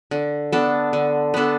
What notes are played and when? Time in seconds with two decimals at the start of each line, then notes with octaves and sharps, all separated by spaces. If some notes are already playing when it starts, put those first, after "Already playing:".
0.11 D3
0.52 B3 D4 A4
0.93 D3
1.34 B3 D4 A4